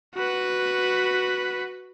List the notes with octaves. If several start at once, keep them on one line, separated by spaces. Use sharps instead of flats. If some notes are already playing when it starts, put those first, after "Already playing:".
F#4 B4